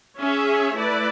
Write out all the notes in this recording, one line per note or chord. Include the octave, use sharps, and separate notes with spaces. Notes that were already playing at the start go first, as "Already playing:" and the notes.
C#4 G#4 C#5 E5
A3 E4 B4 D5